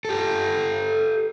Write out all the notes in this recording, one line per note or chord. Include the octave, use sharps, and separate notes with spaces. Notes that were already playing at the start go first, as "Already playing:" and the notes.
G4 A4